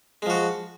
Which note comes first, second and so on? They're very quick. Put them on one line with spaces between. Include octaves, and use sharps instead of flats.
G#3 F3 F#4